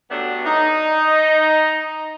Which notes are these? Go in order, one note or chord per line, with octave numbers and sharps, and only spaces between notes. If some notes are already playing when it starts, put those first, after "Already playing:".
F#3 G3 A3 B3 D4
D#4